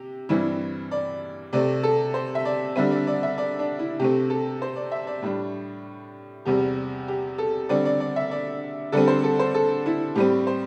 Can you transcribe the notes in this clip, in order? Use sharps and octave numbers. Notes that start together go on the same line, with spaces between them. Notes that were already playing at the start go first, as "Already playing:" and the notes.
Already playing: C3 G4
G2 E3 G3 C4 E4
D5
C3 A3 C4 D5
A4
C5
E5
D5
D3 G3 C4 E5
D5
D5
E5
D5
D4
E4
C3 A3 C4 G4
A4
C5
D5
E5
D5
A2 G3 D4
E2 C3 G3 C4 G4
G4
A4
D3 G3 C4 D5
D5
D5
E5
D5
D3 G3 C4 A4
C5
A4
C5
A4
E4
A2 G3 C4 G4
C5